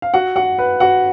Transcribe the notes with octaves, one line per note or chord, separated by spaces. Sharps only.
F5
F#4 F#5
F#4 F#5
B4
F#4 F#5